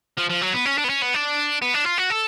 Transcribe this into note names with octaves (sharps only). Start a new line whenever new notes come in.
F3
F3
F#3
B3
C#4
D4
B3
C#4
B3
D4
B3
D4
F4
F#4
A4